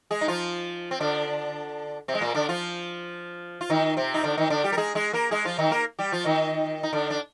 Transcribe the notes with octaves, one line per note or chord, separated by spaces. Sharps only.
G#3 G#4
D#4
F3 F4
C4
D3 D4
C3 C4
G#3
A#2 A#3
D3 D4
F3 F4
F4
D#3 D#4
C3 C4
D#4
D3 D4
D#3 D#4
D3 D4
G3 G4
A#4
G#3 G#4
G#3 G#4
A#3 A#4
G#3 G#4
F3 F4
D#3 D#4
A#3 A#4
G3 G4
F3 F4
D#3 D#4
D#4
D3 D4
D4